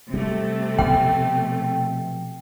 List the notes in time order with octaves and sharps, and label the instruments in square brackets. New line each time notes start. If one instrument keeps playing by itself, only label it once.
[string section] C3 A3 [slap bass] G3
[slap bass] B2 F3 B3 [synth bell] G5